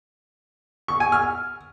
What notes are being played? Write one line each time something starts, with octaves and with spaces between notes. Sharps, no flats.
C#6
G#5
F6